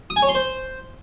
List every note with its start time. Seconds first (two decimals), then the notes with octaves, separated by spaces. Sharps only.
0.10 D#6
0.16 G#5
0.22 C#5
0.29 C6
0.35 C5